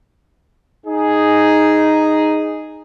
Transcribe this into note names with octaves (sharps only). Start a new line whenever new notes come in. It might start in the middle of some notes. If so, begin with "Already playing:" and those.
D#4 G#4